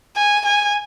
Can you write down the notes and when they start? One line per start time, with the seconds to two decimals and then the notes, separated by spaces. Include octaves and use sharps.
0.16 G#5
0.45 G#5